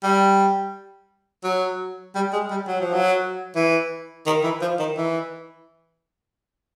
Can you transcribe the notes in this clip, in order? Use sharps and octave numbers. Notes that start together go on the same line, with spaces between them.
G3
F#3
G3
G#3
G3
F#3
F3
F#3
E3
D#3
E3
F3
D#3
E3